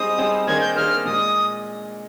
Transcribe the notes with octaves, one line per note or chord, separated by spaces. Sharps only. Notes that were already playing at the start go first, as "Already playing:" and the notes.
Already playing: G3 C4 D#4 G#4 C5 D#6
G3 C4 D#4 G#4 C5
D#3 A#3 D4 G#4 C5 G#6
G6
D#3 A#3 D4 G#4 C5 F6
A#2 G#3 D#6